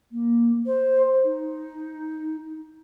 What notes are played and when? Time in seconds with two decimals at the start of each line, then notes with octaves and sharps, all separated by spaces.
0.12 A#3
0.66 C5
1.25 D#4